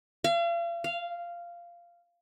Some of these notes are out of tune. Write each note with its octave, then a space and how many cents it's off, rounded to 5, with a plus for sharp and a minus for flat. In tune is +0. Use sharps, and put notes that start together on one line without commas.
F5 -40
F5 -10